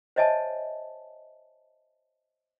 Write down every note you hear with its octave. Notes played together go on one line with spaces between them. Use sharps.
C5 C#5 D#5 E5 G#5 A5